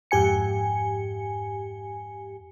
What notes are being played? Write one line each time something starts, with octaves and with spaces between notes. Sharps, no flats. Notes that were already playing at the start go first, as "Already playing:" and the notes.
F2 G#2 G4 G#5 C#7